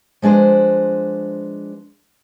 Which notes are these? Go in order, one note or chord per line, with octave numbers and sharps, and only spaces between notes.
F3 G#3 D4 B4 C5